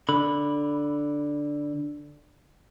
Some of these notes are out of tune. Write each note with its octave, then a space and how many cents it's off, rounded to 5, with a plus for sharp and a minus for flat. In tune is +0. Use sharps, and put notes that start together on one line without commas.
D3 +0 B5 +0